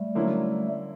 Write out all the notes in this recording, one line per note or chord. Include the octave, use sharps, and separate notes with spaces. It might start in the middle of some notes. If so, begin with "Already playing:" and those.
Already playing: G3 A3
D3 F#3 A#3 C#4 E4